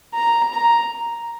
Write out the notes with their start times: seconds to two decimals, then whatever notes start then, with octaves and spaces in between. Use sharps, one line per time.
0.14 A#5
0.54 A#5